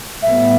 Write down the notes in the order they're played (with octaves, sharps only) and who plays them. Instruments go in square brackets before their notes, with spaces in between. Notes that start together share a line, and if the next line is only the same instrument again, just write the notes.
[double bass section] A2 G3 B3 [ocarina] E5